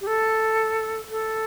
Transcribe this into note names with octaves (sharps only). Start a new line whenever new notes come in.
G4
A4
A4